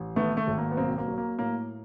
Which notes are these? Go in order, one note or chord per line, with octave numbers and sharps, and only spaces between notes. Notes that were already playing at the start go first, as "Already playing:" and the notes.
Already playing: A1
D#3 A3 B3
A3
G#1
A#3
B3
B1 A#3 C4
A#3
F#3
A#3
A2 A#3